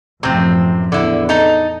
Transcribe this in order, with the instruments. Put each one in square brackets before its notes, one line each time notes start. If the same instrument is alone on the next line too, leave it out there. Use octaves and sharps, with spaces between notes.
[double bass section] A1 F#2 F3 [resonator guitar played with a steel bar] C3 C4
[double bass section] E2 [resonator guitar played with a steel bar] D3 E4
[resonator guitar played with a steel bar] D#4 A4